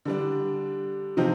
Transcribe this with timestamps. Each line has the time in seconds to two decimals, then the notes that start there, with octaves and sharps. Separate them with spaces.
0.05 D3 G3 D4
1.17 C3 F3 C4 D#4